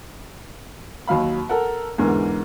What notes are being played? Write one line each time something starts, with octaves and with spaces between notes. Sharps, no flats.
D#2 F#3 F5 B5
A4 A#4 F#5
E2 G#2 D3 A#4